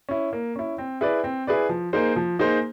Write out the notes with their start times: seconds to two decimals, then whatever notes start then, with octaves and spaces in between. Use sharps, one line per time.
0.09 C#4 E4
0.33 A#3
0.56 C#4 E4
0.78 C4
1.01 E4 G#4 B4 D5
1.24 C4
1.47 E4 G#4 B4 D5
1.69 F3
1.93 A#3 D#4 G#4 C5
2.16 F3
2.39 A#3 D#4 G#4 C5